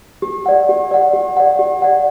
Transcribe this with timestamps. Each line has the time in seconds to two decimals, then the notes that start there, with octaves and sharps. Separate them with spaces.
0.22 G4
0.46 D5 F#5
0.69 G4
0.91 D5 F#5
1.13 G4
1.37 D5 F#5
1.59 G4
1.82 D5 F#5